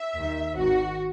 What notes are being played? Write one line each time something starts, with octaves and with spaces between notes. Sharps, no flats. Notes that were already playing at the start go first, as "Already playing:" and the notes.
Already playing: E5
D#2 D#3
G#1 G#2 D#3 F#4